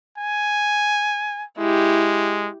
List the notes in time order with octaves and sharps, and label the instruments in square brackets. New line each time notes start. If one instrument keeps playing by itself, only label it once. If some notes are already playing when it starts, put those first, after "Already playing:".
[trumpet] G#5
[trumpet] G#3 [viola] E4 G4